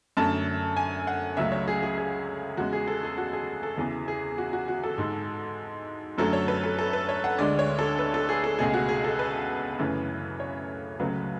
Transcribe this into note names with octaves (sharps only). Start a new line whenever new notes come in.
F#2 D3 A3 A5
G#5
F#5
C#2 C#3 F#3 A3 E5
C#5
G#4
G#4
G#4
E2 C#3 G#3 F#4
G#4
A4
G#4
F#4
G#4
A4
E2 C#3 E3 G#4
G#4
F#4
F#4
F#4
A4
G#2 G#3
F#2 D3 F#3 A3 A4
C#5
B4
A4
A4
B4
C#5
F#5
D2 D3 G#3 D5
C#5
A4
B4
A4
G#4
A4
C#2 B2 A3 G#4
F#4
G#4
A4
B4
F#2 C#3 E3 A3
C#5
C#2 C#3 F#3 A3 B4